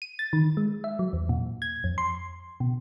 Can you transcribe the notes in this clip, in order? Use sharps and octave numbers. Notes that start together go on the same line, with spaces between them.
D#7
A6
D#3
G#3
E5
F#3
E2
A#2
G#6
F2
C6
B2